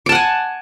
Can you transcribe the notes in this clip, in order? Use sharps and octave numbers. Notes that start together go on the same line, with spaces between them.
F#5 G#5 A5 D6